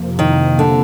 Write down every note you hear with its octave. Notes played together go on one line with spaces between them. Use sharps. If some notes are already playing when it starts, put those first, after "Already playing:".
Already playing: F2 C3 F3 A#3
D#3
D3